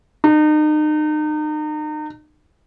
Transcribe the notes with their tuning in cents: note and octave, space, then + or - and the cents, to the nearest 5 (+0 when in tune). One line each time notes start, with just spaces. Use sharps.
D#4 -35